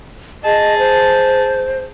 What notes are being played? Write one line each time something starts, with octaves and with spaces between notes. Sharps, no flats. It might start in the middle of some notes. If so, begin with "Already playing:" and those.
G#4 D#5 A5
C5